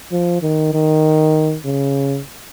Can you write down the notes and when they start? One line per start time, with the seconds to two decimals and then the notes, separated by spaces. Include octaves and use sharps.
0.11 F3
0.42 D#3
0.73 D#3
1.65 C#3